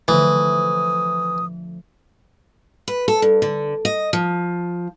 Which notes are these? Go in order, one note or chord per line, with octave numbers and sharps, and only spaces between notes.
D3 E3 F3 A3 D#6
B4
A4
G2
D3
D#5
F3